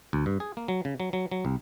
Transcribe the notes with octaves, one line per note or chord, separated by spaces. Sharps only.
D2
G2
G#4
A#3
F#3
C#3
F#3
F#3
F#3
C2